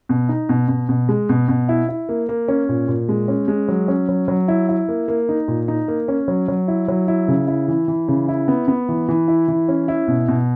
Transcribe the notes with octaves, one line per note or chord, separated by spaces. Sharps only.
B2
D#4
B2
B2
B2
G#3
B2
B2
E4
E4
A#3
A#3
C#4
A#2
A#2
G#3
C#4
G#3
F#3
C#4
F#3
F#3
E4
E4
A#3
A#3
D#4
A#2
D#4
A#3
C#4
F#3
F#3
E4
F#3
E4
C#3
E4
E3
E3
C#3
E4
B3
B3
E3
E3
E4
E3
C#4
E4
B2
B2